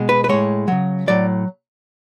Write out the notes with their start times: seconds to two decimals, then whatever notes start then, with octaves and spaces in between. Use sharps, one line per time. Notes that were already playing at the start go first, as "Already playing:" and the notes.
Already playing: B2 G#3
0.09 B4
0.24 B4
0.29 A2 G#3 C#5
0.68 C#3 F#3
1.07 A2 F#3 D5